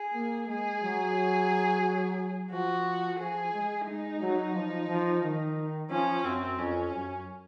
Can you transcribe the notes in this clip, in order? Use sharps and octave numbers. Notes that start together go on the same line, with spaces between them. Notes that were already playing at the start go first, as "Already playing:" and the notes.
Already playing: G#4
A#3
G#3 G#4
F#3
F3 F#4
F3 G#4
G#3
G#3 D#4
F#3
F3
F3
D#3
F3 C#4
F#2 C4
F2 C#4
F#2